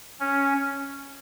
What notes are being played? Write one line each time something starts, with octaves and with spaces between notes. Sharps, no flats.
C#4